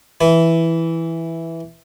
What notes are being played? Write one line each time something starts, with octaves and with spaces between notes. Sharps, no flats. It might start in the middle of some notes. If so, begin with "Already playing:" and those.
E3 E4